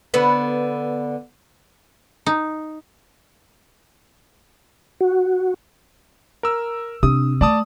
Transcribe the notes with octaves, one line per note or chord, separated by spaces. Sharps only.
D3 B3 B4
D#4
F#4
A#4 E6
C3 D4 D#6
A3 D5 A5 D#6